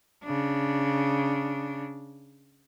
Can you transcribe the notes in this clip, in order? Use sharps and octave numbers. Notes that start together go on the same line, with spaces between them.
C#3 D4